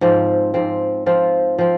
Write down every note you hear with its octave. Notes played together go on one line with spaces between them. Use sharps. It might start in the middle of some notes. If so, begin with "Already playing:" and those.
G#2 F3 C4
G#2 F3 C4
F3 C4 F4
F3 C4